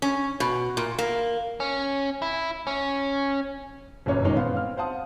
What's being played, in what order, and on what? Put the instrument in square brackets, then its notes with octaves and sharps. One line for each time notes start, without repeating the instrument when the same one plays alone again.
[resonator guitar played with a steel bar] C#4
B2
A#2
A#3
[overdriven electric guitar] C#4
E4
C#4
[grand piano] G1 F#2 A#2 C#4 C#5
A#2 D#3 G#3 C#4
B3 C5 F5
C4 F6
C5 F5 F#5 A5 D#6